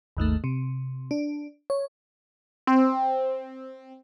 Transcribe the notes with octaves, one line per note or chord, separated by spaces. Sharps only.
G#1 D#2 D#3 A3
C3
D4
C#5
C4